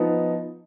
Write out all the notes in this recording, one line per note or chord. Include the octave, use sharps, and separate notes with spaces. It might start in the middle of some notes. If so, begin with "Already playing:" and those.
Already playing: F3 B3 D#4